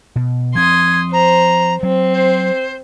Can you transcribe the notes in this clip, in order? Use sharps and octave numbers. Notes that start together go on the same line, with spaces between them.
B2
F3 C4 C6 D#6 G#6
C5 A#5
F#3 C4
C5